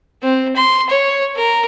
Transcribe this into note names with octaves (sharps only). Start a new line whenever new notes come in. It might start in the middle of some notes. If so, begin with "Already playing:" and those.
C4
C6
C#5
A#4